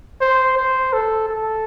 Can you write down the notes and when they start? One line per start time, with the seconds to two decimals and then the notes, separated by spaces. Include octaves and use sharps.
0.21 C5
0.58 C5
0.93 A4
1.29 A4